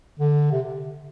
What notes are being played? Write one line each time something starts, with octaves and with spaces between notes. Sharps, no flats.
D3
C3